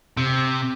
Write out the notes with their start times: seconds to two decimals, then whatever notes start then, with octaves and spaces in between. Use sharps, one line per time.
0.17 C3